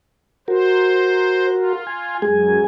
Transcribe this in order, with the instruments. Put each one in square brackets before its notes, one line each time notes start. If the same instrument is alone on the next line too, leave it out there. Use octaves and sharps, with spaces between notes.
[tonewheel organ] F#4 A#4 [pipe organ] C5
[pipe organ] F4
[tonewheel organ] G#5
[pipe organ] F#2 [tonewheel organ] G#3 G#4 G#5